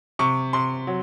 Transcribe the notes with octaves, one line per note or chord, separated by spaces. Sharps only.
C3 C#6
C3 C6
F#3